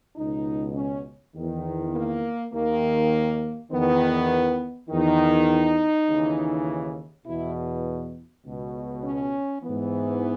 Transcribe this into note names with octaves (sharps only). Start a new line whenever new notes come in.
C#2 B2 D#4
C#4
E2 D#3
A#3
D#2 D#3 A#3
E2 D#3 B3
E2 D#3 D#4
D#2 C#3 E3
E2 B2 E4
C#2 B2
C#4
G#2 E3 B3